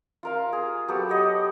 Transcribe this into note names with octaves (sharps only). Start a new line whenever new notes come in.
F4 A#4 F5
G#4
F#3 B3 G4 A4
G4 C#5 D#5 F#5